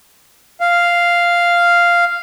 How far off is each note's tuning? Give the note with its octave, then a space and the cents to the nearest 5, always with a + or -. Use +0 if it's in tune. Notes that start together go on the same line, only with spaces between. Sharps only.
F5 -5